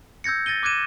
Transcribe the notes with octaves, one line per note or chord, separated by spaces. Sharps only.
E6 G6 G#6 A#6 C#7
A6 A#6 D#7 G7
D6 F#6 G#6 D#7 E7